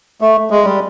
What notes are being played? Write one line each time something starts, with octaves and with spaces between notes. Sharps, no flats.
A3
G#3
G3